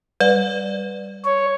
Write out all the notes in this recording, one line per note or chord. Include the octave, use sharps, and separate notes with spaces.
G3 B4 D5
C#5